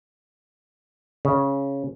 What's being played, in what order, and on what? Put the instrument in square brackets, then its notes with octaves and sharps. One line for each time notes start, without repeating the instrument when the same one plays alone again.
[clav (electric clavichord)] C#3